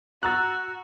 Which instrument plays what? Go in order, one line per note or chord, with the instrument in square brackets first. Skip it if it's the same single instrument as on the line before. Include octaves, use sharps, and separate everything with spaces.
[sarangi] F#4 [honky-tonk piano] A#5 E6 A6 [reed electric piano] F#6